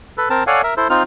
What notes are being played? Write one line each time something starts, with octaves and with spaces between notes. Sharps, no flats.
A4 B4
C4 A#4 A5
A4 C#5 D5 F5 F#5 G#5
A#4 E5
E4 A4 C5
C4 D#4 F4 F6